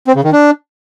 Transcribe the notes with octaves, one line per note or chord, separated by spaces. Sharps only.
C4
C#3
D#3
D4